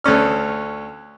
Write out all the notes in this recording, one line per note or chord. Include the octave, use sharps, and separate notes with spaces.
D2 A3 C#4 F6